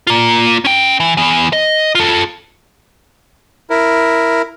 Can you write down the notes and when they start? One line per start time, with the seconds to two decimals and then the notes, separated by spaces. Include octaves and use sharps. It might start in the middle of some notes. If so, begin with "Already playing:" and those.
0.07 A#3 F4
0.65 C#4 G5
1.00 E3
1.17 E3 B3
1.53 D#5
1.95 F4 A4
3.70 E4 A#4